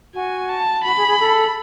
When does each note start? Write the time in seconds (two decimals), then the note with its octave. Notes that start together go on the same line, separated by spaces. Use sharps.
0.14 F#4 G#5
0.49 A5
0.84 F#4 B5
0.97 G#4
1.08 G#4
1.20 A4